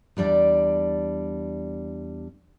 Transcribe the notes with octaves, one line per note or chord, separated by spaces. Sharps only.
E2 G3 D4 D5